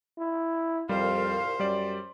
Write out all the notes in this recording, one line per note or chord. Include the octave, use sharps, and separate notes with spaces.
E4
C2 F2 A#2 G3 C5 F5
F#2 G3 D5